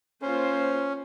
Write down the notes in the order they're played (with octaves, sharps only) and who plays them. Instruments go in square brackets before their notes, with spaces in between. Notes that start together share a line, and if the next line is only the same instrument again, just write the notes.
[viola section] A#3 F4 C5 [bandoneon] C#4